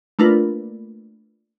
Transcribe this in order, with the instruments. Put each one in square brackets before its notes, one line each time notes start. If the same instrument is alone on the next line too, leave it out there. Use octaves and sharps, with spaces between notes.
[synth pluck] A3 A#3 D4 F4 A#4 B4